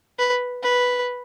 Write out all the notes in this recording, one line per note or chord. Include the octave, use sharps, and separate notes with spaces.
B4
B4